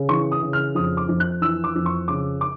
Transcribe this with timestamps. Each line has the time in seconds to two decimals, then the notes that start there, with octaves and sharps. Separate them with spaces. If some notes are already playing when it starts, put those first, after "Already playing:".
Already playing: C#3
0.09 E3 C#6
0.32 D#6
0.43 C#3
0.53 F6
0.75 F2 D#6
0.97 D6
1.09 F2
1.20 F#6
1.41 E3 E6
1.64 D6
1.76 F2
1.86 C#6
2.08 C#3 D6
2.41 D6